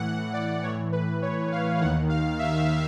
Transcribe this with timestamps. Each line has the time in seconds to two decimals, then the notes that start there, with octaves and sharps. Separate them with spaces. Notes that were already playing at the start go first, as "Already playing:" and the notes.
Already playing: A2 E3 F#5
0.33 D5
0.63 A2 E3 C#5
0.92 B4
1.22 C#5
1.52 F5
1.81 D#2 D#3 F#5
2.09 F5
2.39 E5